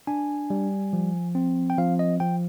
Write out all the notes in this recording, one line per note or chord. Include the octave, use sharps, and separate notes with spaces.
D4 G#5
G3
F3
C4
G5
F3 F5
D#5
F3 G5